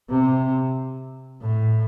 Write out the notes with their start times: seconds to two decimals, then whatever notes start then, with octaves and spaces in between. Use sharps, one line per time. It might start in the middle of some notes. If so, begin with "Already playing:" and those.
0.10 C3
1.41 A2